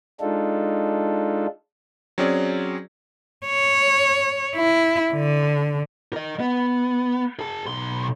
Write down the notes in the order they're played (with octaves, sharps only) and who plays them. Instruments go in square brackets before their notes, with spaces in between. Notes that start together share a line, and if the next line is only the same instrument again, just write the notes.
[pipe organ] G#3 D4 D#4 F4 A4
[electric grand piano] F#3 C4 C#4 G#4 D5
[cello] C#5
E4
D3
[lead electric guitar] A#4 D#5
B3
G#4 A5
B1 C6